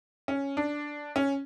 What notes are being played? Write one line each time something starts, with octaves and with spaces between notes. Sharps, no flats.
C#4
D4
C#4